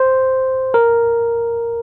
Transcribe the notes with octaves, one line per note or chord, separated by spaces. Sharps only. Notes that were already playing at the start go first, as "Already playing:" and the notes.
Already playing: C5
A#4